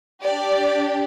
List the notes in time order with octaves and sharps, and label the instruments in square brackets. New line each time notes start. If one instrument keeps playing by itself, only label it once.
[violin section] D4 G4 D5